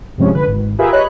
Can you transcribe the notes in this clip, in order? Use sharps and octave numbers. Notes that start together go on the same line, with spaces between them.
G2 C3 F3 G#3 C#4
D3 B4
G#1
F4 G4 G#4 A#4 B4 E5
C#5 D#5 B5 F#6